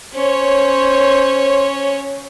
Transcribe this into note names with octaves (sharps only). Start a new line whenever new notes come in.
C#4 C5 C#5